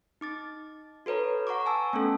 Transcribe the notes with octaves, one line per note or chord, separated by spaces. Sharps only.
D#4 D6 A6
F#4 A4 B4 C#5 A#5
F#5 A#5 C#6 D6
G#5 A5 E6
A3 B3 C#4 A4